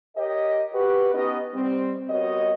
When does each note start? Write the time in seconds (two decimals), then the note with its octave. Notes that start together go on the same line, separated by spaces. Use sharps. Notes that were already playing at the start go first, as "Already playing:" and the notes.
0.17 G4 A#4 C#5 D#5
0.73 F#4 G4 B4
1.13 B3 C#4 D#4 G4 D#5
1.54 G3 C4
2.09 G3 B3 F#4 A#4 C#5 D#5